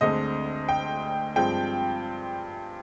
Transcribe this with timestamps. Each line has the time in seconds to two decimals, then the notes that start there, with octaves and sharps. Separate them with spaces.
0.01 D2 D3 G#3 C4 D#5
0.69 G5
1.36 G2 F3 G#3 C4 G5